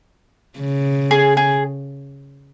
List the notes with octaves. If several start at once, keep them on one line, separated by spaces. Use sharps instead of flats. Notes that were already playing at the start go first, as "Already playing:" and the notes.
C#3
G#4
G#4